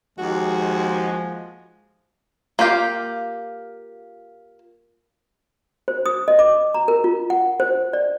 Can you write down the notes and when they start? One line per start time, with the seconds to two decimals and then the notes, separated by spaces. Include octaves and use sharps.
0.18 D#2 F3 G#3 F#4
2.59 A#3 F4 G4 F5
5.88 C5
6.06 D#6
6.28 D#5
6.39 D6
6.74 A#5
6.88 A#4
7.04 F4
7.30 F#5
7.60 C5
7.93 D5